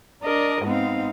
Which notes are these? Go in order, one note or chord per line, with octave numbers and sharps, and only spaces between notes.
D4 A#4 D5 D#5
G#2 B3 C4 D#4 F5